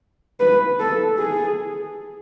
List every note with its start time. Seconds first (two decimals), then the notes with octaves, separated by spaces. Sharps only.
0.40 B4
0.79 A4
1.18 G#4